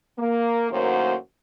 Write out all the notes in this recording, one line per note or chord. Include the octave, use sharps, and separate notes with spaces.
A#3
F#2 A2 D#3 F#3 A#3 C5